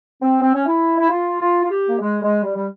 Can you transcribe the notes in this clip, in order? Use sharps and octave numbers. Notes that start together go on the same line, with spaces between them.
C4
C4
C#4
E4
E4
F4
F4
F4
G4
A#3
G#3
G#3
G3
G3